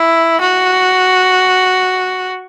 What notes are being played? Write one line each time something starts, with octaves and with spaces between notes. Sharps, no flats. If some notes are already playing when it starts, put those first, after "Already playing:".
Already playing: E4
F#4